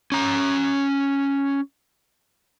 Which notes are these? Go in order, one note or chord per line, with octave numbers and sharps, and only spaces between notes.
C#4 A#5